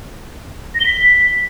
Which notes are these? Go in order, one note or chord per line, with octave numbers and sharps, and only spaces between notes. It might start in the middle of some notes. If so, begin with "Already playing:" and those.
A#6
G7
B6